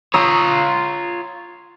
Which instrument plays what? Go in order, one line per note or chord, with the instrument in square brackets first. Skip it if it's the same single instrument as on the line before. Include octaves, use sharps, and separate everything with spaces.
[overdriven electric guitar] F4 C#5 [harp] A#5 D#6 E6